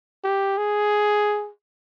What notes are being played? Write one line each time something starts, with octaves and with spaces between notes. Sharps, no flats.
G4
G#4